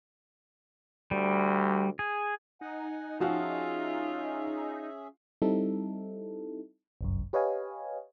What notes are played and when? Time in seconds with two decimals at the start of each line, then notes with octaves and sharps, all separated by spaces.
1.11 D2 G3
1.99 G#4
2.61 D#4 F#5 G#5
3.20 F3 C#4 F4 F#4 G#4 E5 F5
5.42 G3 C4 D#4 E4 A4
7.01 G1 C2 F#2
7.33 G4 B4 C#5 D#5 F5 G#5